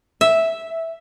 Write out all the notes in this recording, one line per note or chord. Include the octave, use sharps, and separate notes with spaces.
E5